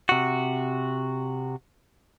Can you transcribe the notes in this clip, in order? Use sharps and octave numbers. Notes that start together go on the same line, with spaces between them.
C3 F#4